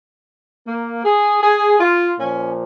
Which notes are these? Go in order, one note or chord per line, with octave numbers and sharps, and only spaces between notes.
A#3
G#4
G#4
F4
A#2 F3 C#4